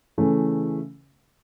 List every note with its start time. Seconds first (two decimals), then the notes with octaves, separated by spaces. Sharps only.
0.18 C#3 E3 A3 C#4